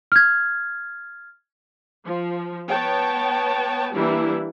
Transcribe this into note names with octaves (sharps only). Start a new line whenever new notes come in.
F6 G#6
F3
B3 C#5 G5 A5
E3 G3 A#3 D4 E4